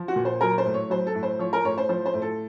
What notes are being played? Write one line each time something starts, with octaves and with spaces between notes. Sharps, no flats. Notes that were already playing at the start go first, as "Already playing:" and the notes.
Already playing: F3
F#4
A#2
C5
F#3 A#4
C5
A2
C#5
F#3 C5
A4
A2
C5
F3 C#5
A#4
A2 C#5
C5
F3 C5
C5
A2
A4